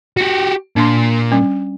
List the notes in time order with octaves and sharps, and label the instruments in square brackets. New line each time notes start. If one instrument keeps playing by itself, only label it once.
[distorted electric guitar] F#4 G4
[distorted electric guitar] A#2 [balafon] D4 C6
[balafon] G3 C#4